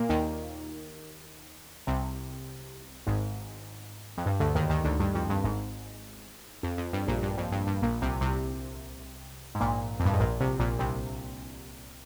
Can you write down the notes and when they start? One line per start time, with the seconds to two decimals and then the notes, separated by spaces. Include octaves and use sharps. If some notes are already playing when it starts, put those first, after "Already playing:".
Already playing: A#2 A#3
0.09 D#2 D#3
1.87 C2 C3
3.07 G#1 G#2
4.17 F2
4.26 G2
4.40 D2 D3
4.55 D#2 D#3
4.69 D#2 D#3
4.84 D2 D3
5.00 G2
5.15 F2
5.29 G2
5.44 G#1 G#2
6.63 F2
6.78 F2
6.93 G2
7.07 A#1 A#2
7.22 G2
7.38 F2
7.52 G2
7.67 G2
7.82 A#1 A#2
8.02 C2 C3
8.21 C2 C3
9.55 G#2
9.60 A#1 A#2
10.00 F2
10.05 G2
10.13 G#2
10.19 A#1 A#2
10.40 C2 C3
10.59 A#1 A#2
10.79 C2 C3